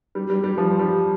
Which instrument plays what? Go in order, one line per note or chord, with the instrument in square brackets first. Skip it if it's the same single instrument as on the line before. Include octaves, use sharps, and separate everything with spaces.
[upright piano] G3
G3
G3
F3
G3